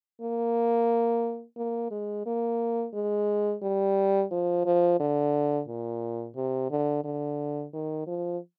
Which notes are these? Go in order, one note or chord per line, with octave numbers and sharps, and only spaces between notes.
A#3
A#3
G#3
A#3
G#3
G3
F3
F3
D3
A#2
C3
D3
D3
D#3
F3